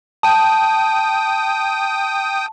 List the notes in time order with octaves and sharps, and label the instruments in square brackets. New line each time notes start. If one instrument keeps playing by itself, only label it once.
[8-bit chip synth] G5 D#6 [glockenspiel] A5